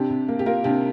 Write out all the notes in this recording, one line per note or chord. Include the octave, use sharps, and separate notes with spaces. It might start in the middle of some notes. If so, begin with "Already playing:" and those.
Already playing: C3 D4 G4
C3
A#3
G4
A#3 F4 A#4
C3 D4 G4